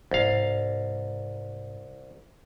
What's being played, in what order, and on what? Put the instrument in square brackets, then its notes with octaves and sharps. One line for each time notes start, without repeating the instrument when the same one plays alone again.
[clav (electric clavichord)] C2 F5 [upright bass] G#2 C3